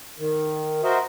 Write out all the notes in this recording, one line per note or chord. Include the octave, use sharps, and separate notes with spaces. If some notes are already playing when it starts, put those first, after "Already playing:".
D#3
F#4 A#4 C5 D#5 E5